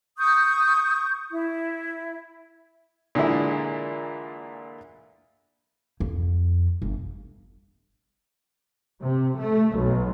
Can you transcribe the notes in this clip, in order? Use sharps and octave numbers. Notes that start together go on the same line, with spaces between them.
C#6 D#6 G6
E4
A#2 D3 E3 G#3 E4
F2
G1
C3
A3
B1